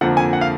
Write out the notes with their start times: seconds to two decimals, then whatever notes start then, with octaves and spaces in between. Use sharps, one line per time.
0.01 F2 D3 F3 A#3 F#5
0.17 G#5
0.33 F#5
0.41 F5